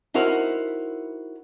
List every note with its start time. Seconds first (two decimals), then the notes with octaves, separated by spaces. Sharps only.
0.14 D#4 E4 F#4 A#4 C5